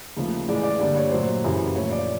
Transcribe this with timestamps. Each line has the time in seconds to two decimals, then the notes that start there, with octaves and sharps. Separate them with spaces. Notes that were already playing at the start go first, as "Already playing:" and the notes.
0.16 D#2 C#3 F3 A3
0.48 A2 E3 G#3 D5
0.63 D5
0.80 G2 D3 G3 A#3 D5
0.96 C#5
1.12 A#2 F#3 A3 C5
1.44 F#2 C#3 E3 G3
1.75 A#2 F3 A3 C#5
1.91 D5